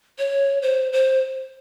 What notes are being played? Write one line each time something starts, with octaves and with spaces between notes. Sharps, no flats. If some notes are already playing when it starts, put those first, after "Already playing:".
C#5
C5
C5